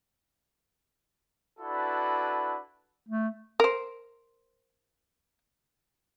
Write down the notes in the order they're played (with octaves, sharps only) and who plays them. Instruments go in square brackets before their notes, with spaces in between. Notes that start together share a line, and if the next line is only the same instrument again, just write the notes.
[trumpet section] D4 E4 F#4 A4 B4
[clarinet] A3
[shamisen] A#4 C5